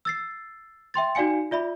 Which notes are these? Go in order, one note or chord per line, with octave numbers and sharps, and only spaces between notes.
E6 A6 C7
E5 G5 C6 A6
D#4 F#4 D5 F5 G#5 C#7
F4 D5 E5 B5